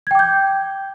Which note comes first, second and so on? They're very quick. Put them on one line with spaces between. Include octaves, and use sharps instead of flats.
G#6 G5 D6 G6